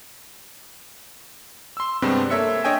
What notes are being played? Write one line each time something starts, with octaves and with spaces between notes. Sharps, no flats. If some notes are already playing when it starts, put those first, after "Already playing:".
C6 E6
G2 C3 G#3 B3 C4 D4
A#3 A4 C#5 E5 E6 C#7
D4 C#5 D#5 E5 G5 G#5